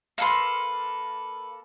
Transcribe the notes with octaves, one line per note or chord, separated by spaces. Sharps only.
A#3 A4 B4 F5 C6